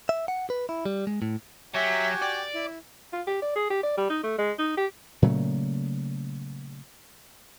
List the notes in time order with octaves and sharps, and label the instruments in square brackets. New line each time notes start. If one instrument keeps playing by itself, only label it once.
[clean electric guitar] E5
F#5
B4
E4
G3
G#3
A2
[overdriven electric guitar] F#3 [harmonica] F#4 G4 [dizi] E5 [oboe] G#5
[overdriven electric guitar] D5 [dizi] G5
[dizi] E4
[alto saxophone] F4
G4
D5
G#4
G4
D5
G3
D#4
A3
G#3
D#4
G4
[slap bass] A#2 C#3 F#3 A3